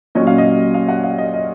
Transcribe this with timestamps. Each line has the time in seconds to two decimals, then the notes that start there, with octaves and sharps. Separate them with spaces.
0.15 A#2 F#3 C#4 D#5
0.27 F5
0.38 D#5
0.74 F5
0.89 F#5
1.03 F5
1.18 D#5
1.33 D#5